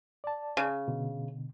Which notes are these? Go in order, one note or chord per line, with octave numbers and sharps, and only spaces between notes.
D5 A5
C#3
B2 D3